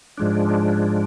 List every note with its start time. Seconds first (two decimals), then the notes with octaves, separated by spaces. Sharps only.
0.18 G#2 F3 G#3 D4